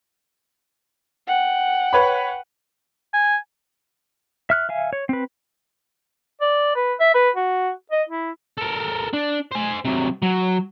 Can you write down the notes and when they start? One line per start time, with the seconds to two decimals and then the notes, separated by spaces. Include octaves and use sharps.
1.26 F#5 G5
1.93 B4 C#5 B5
3.14 G#5
4.50 E5 F6 F#6
4.69 E5 F5 G#5
4.93 C#5
5.09 C4 B4
6.42 D5
6.76 B4
7.00 E5
7.15 B4
7.36 F#4
7.92 D#5
8.09 E4
8.58 A4 A#4
9.14 D4
9.51 C5 G#5
9.85 C3 F#3
10.22 F#3